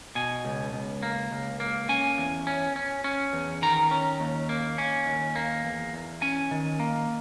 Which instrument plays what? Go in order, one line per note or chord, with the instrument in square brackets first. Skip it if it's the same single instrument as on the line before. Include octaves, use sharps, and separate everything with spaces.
[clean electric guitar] B2 G#5
C#2
C#2
A#3
C#2
A#3
C#4 G#5
E2
C#4
C#4
C#4
E2
D#3 A#5
C#4
D#2
A#3
C#4
D#2
A#3
E2
E2
C#4 G#5
D#3
A#3